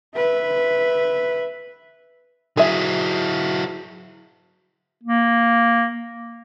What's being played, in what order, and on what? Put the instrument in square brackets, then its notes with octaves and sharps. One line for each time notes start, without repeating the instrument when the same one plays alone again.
[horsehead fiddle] B4 E5
[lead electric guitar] F#3 E4 [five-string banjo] G#4 E5
[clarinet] A#3